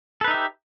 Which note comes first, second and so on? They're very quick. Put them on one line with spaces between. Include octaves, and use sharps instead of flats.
A4 B4 D#4 E5 G4